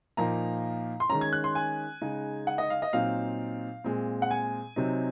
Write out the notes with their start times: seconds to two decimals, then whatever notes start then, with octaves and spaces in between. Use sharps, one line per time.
0.17 A#2 F3 A#3 D#4 A#5
1.00 C6
1.09 D#3 G#3 C#4 A#5
1.21 G#6
1.33 F#6
1.44 C6
1.55 G#5
2.02 C#3 G#3 D#4
2.47 F#5
2.58 D#5
2.70 F5
2.82 D#5
2.93 A#2 F#3 C4 D#4 F5
3.84 A#2 G#3 C4
4.22 F#5
4.31 G#5
4.76 C3 F#3 C4 D#4